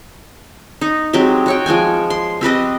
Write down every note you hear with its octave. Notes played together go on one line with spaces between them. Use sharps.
D#4
F#3 G#3 C4 G4
F#4 C#5 G5
F3 G#3 G5 G#5
C6
C4 G4 B4 D#5